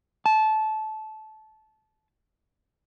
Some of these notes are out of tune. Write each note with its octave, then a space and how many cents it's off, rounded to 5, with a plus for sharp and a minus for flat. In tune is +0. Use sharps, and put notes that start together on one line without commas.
A5 -20